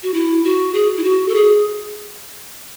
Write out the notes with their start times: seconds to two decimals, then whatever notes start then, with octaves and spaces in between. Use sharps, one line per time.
0.03 F#4
0.14 E4
0.44 F#4
0.74 G#4
0.97 E4
1.04 F#4
1.28 A4
1.35 G#4